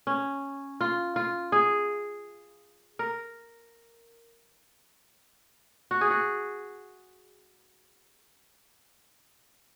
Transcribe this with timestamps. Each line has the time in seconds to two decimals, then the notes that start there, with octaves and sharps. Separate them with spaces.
0.07 C#4
0.81 F4
1.16 F4
1.52 G#4
2.99 A#4
5.91 F#4
6.01 G#4
6.10 F#4